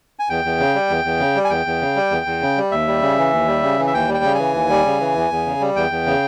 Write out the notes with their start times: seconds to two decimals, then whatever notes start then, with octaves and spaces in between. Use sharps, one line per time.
0.19 G#5
0.29 E2 G5
0.45 E2
0.60 C#3
0.75 G3
0.90 E2
1.04 E2
1.20 C#3
1.36 G3
1.45 G#5
1.50 E2 G5
1.66 E2
1.81 C#3
1.96 G3
2.11 E2
2.26 E2
2.42 C#3
2.57 G3
2.72 D#2 E5
2.88 G3
3.02 C#3
3.18 E3
3.33 D#2
3.48 G3
3.63 C#3
3.79 E3
3.87 E5
3.94 D#2 G5
4.09 G3
4.14 G5
4.24 C#3
4.34 E3 G#5
4.54 D#2
4.70 G3
4.85 C#3
5.01 E3
5.16 E2
5.31 E2
5.46 C#3
5.61 G3
5.76 E2 G5
5.91 E2
6.06 C#3